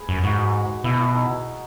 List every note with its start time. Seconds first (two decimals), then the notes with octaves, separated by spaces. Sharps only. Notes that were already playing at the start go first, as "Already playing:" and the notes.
Already playing: G#4 B4
0.09 F#2
0.24 G#2 F#4
0.84 B2 E4
1.00 E4
1.15 D#4